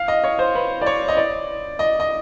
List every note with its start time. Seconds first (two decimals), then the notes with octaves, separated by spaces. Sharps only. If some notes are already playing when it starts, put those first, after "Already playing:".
Already playing: F5
0.08 D#5
0.24 C#5
0.39 C5
0.55 B4
0.82 D5
0.86 C#5
1.08 D#5
1.17 D5
1.79 D#5
2.00 D#5